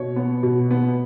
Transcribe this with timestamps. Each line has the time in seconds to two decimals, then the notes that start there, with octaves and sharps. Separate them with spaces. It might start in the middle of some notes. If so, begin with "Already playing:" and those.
Already playing: B2 C#5
0.16 B3
0.43 B2
0.71 B3